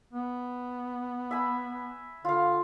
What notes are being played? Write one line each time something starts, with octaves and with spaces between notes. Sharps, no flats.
B3
E5 G#5 B5
D3 F4 F5